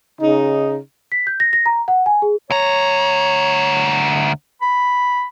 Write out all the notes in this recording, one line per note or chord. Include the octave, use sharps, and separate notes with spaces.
C#3 D#4
B6
G6
A#6
A#6
A#5
F#5
G#5
G#4
D2 C#5 A#5
B5